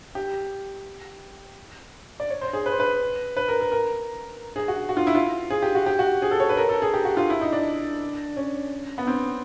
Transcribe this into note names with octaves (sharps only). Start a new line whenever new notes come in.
G4
D5
C#5
C5
G#4
B4
C5
B4
B4
A#4
A#4
A#4
G#4
F#4
F#4
F4
E4
F4
G#4
G4
F#4
G4
F#4
G#4
A4
C#5
B4
A#4
A4
G#4
G4
F#4
F4
E4
D#4
D4
C#4
B3
C4